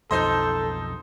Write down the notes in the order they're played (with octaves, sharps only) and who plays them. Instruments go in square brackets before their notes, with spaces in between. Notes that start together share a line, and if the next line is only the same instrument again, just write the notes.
[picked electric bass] B1 F2 [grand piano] D#4 C5 D#5 [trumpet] A4 [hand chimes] C6 G6